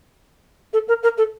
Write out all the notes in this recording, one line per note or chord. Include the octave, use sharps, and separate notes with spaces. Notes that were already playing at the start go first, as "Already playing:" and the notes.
A4
A#4
A#4
A4